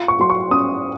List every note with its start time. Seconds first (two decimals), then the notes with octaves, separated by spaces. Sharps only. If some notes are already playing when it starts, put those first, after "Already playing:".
Already playing: F4
0.08 C#6
0.19 F#3 C6
0.30 C#6
0.51 C#4 D#6